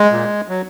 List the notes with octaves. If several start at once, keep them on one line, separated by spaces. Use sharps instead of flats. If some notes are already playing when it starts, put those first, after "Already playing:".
Already playing: G#3
A#2
F#3